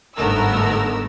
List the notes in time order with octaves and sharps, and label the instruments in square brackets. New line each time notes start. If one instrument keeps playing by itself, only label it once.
[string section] G1 G#2 A3 B3 A#4 E6